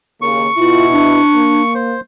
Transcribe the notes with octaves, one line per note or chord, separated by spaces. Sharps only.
D#2 C#3 A#3 C#6
B2 E4 F4
D4
A#3
C5